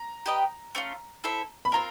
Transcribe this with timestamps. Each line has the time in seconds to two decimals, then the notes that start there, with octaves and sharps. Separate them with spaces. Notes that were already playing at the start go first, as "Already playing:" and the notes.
Already playing: A#5
0.26 G4 B4 D#5 G5
0.75 A3 C#4 F4
1.24 E4 A4 C5 E5
1.65 B5
1.72 C4 F4 A#4 A#5